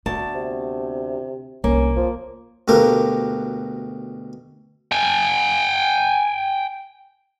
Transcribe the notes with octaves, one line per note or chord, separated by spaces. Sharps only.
D2 B3 A5
C3
C2 C#3 A#3 C#4
D2 F3
D2 B2 A#3 G4 A4 A#4
G5 G#5